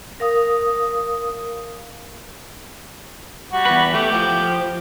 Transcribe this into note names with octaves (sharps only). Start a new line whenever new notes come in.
A#4 F5 D#6
G3 F#4
E2 B4
A3 G4
F3